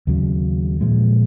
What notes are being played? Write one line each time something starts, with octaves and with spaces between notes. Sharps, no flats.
D#2 C#3 F#3
A#2 F3 G#3